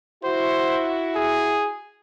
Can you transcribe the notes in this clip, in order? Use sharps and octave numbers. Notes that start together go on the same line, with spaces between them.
E4 F#4 C5
G#4